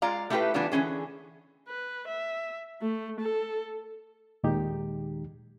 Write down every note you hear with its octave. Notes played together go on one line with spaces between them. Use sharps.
G#3 F4 D5 F5 A#5
A3 E4 F4 G4 A4 B4
E3 G3 B3 D4 F4
D3 E3 C4 C#4 G#4
B4
E5
A3
A4
D#2 A#2 D#3 G#3 D#4 G4